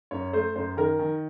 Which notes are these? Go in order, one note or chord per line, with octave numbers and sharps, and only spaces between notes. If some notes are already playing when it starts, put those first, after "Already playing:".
F#2 C#5
A3 C5
F#2 C5
D#3 A#4
D#3